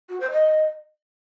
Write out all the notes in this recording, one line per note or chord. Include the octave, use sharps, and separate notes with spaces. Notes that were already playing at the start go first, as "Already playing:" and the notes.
F#4
C5
D#5